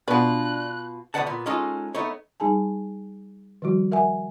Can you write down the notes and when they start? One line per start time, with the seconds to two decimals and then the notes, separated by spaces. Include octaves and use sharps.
0.08 B2 B3 D4 F4 B4 F#6
1.14 D2 B2 B4 D5 F#5 A5
1.27 A#2 B3
1.46 G#3 C#4 D#4 F4 A4
1.95 A3 B3 D#4 C#5
2.40 G3 D#4 G#4 G#5 A5
3.62 D#3 F3 G3 F#4
3.92 A#4 E5 F#5 G#5